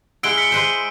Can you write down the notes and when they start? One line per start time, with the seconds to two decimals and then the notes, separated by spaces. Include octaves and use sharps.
0.23 G#3 E4 F#5 E6 D7 G7
0.37 F6 B6 C#7
0.52 G#3 B4 C5